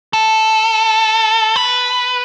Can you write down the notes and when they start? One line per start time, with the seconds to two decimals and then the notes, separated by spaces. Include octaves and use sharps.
0.13 A4
1.56 B4